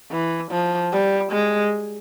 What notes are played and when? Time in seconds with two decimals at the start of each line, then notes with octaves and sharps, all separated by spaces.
0.12 E3
0.52 F3
0.92 G3
1.32 G#3